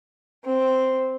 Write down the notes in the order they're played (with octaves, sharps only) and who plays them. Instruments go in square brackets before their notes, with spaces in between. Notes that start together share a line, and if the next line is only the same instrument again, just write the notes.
[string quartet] C4